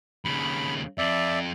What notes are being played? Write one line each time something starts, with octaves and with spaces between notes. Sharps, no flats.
D#2 C#3 B5
F2 D5 E5